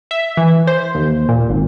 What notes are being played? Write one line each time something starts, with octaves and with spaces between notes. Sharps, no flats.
E5
E3
C5
D#2
A#2
G#1